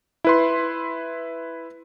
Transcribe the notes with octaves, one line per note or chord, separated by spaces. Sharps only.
E4 B4 C6